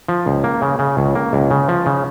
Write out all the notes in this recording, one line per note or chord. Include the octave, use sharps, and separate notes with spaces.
F3
C#2
A#3
C#3
C#3
C#2
A#3
C#2
C#3
F3
C#3